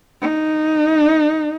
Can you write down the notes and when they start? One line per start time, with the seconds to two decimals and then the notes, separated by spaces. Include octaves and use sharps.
0.21 D#4